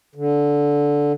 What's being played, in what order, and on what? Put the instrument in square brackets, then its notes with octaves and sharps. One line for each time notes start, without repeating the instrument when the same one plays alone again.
[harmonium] D3